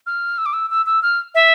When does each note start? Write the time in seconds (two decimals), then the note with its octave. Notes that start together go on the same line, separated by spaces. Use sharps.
0.07 F6
0.38 E6
0.46 D6
0.53 E6
0.70 E6
0.86 E6
1.03 F6
1.35 E5